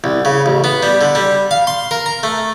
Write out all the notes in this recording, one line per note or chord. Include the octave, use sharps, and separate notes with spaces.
C2
C#3
A1
B3
G3
D3
G3
F5
C6
A#4
A#5
A3